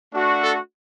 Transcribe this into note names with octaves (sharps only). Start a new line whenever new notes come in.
A3 D4 F#4
A4